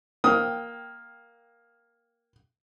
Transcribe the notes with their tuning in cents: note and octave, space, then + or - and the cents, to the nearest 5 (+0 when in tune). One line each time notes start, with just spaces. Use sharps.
A#3 +5 G5 +0 D#6 +20